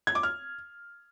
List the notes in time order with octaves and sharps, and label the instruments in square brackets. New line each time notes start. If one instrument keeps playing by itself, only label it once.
[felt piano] G#6
D6
F6